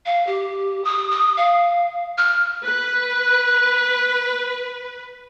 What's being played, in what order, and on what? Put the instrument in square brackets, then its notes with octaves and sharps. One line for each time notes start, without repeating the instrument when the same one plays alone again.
[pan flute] F5
G4
D#6
D#6
F5
F6
[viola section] B4 [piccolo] F#6